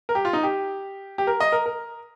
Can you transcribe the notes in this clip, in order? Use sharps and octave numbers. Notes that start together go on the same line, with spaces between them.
A#4
G4
F4
D#4
G4
G4
A#4
D#5
A#4
A#4